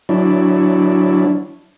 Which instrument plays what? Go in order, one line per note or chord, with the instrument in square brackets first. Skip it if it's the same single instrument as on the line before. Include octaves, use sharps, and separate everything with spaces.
[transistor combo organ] F#3 D4 E4